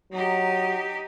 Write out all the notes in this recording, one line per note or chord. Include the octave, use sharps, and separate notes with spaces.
F#3 D#4 G4